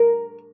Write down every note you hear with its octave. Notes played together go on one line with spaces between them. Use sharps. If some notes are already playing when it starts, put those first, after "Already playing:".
Already playing: A#4